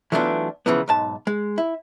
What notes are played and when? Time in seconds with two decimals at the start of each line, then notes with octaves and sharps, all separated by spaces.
0.12 E3 F#3 A3 B3 D4 F4
0.66 C#3 E3 F3 B3
0.88 B1 G#2 A5
1.27 G#3
1.58 E4